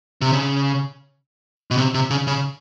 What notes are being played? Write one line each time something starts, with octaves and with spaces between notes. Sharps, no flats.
C3
C#3
B2
C3
C3
C#3
C#3